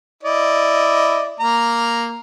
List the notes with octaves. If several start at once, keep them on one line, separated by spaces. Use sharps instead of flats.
E4 D5 D#5
A#3 A#5